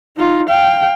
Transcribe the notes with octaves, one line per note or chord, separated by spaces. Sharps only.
D#4 F4
F5 G5